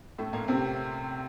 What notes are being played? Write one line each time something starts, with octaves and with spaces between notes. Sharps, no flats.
A2 A3
A#2 A#3
C3 C4